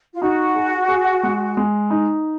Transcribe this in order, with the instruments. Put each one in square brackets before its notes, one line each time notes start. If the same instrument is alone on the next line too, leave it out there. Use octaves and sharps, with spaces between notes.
[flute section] F4
[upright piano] D#4 [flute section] F#4
[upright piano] G#4
G#4
G#3
G#3
D#4